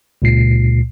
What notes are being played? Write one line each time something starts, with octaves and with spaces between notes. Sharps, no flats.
C#2 A#2 C7